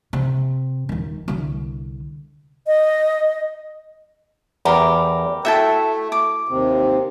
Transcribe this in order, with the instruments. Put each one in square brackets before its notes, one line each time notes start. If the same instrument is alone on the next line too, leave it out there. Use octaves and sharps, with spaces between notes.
[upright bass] C3
D#1 D#3
C2 D3
[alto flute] D#5
[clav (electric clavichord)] E2 [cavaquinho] G4 A#4 B5
[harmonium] A3 [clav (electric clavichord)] E4 F#4 [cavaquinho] E5 G5 A5
[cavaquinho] D6
[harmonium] D#2 C3